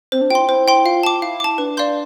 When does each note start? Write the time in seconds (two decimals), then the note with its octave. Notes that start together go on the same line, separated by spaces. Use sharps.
0.12 C4 C5
0.21 D4
0.30 F4 G5
0.35 E4 C6
0.49 E4 C5
0.68 G5 C6
0.85 F4 F5
1.03 A5 D6
1.22 E4 F5
1.40 A5 D6
1.58 D4 B4
1.77 D5 F5 C6 G6